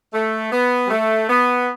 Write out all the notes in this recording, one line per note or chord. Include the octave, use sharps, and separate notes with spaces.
A3
B3
G3
A3
B3